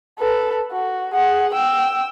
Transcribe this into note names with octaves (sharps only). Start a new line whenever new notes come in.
A4 B4
F#4
G#4 F#5
G5 E6